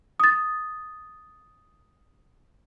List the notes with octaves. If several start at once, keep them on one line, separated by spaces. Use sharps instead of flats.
D#6 A6